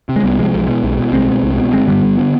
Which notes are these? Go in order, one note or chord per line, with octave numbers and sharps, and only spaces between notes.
C3
G#3
C2 G3 B3
C3 F3 G#3
B1
B2
B1
B2
C2 G#3 C4
B2
C2
B2
G1 G#3 C4
G2 D3 G3 B3
G1
D3